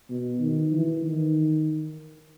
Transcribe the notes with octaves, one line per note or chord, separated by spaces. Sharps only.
B2
D#3
E3
D#3